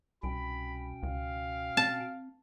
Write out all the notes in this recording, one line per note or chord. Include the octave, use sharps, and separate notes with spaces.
C2 B2 C#4 G5 B5
C#2 F5
C4 A5